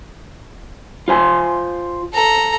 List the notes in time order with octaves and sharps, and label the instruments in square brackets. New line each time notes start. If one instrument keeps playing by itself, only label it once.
[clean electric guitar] F4 C5 G#5
[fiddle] A4 A#5